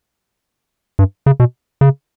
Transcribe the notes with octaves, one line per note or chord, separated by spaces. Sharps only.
G2
C#3
B2
C#3